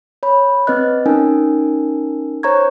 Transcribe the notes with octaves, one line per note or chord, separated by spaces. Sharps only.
C#5 B5
C4 B4 D#5 F#6
C#4 D#4 A#4 G#5
C5 C#5 A#5 C#6 G#6